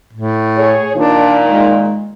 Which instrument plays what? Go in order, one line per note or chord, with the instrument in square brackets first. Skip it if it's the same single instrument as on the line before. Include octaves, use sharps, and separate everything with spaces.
[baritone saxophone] A2
[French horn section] G#4 C#5
[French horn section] A#2 D#3 [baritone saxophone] D4
[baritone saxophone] G#3